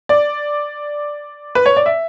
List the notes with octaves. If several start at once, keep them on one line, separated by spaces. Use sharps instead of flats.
D5
B4
C#5
D5
E5